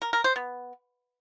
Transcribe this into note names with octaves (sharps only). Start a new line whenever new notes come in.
A#4
A#4
C5
B3